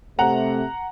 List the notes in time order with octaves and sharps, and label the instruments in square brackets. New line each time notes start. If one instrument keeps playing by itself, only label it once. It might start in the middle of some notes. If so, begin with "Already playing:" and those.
[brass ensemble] C3 A3 [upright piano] F#5 A#5